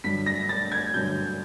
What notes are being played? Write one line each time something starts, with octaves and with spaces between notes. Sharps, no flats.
G2 D3 F#3 B6
A#6
A6
G#6
G2 D3 F#3 G6